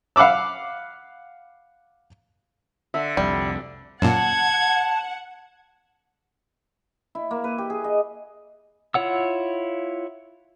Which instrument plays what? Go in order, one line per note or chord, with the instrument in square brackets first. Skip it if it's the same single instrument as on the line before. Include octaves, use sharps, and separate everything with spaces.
[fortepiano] F5 F#5 B5 D6 E6
[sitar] D3 [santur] E5
[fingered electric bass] C2 F2 [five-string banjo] G3
[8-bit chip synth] F#2 A#2 [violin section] F#5 [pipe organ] A5 [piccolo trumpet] G#6
[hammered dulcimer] E4
A#3
B4
G4
G#4
D#5
[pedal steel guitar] E4 F4 C#5 F#5 E6